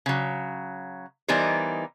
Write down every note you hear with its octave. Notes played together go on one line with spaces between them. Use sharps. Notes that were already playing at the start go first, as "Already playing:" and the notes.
C#3 F#3
E3 G3 B3 D#4 A#4 C5